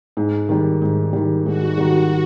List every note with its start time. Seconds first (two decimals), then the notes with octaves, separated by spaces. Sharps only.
0.17 G#2
0.49 D#3 G3
0.82 G#2
1.13 D#3 G3
1.46 G#2 F#4
1.78 D#3 G3